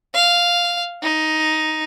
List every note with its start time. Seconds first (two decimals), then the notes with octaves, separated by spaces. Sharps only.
0.15 F5
1.03 D#4